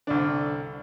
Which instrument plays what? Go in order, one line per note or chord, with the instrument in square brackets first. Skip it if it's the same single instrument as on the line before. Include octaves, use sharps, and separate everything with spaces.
[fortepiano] C2 D4 [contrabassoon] D3